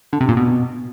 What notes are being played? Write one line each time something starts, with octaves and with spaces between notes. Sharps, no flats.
D3
C3
A#2
B2